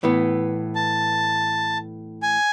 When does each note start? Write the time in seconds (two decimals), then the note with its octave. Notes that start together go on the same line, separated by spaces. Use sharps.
0.03 A2 E3 B3
0.75 A5
2.23 G#5